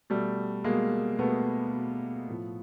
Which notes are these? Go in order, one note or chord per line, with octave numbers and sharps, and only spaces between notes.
B2 G3 A3
B2 G#3 A#3
B2 A3 B3
B2
A2 F3